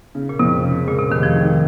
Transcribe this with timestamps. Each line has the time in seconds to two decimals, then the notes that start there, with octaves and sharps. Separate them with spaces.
0.15 C#3
0.29 A#2
0.39 F2 C3
0.63 C#3
0.87 A#2 G#3
0.99 C3
1.10 F1 D#3
1.23 F3
1.35 D#3